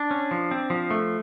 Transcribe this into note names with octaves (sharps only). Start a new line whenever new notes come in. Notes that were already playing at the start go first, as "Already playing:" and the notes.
Already playing: D4
C#4
F3
C4
F3
A3